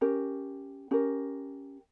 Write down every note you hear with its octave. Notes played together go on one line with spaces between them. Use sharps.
C#4 G4 A#4
C#4 G4 A#4